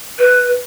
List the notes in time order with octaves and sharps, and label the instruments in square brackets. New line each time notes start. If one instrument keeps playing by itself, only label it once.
[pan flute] B4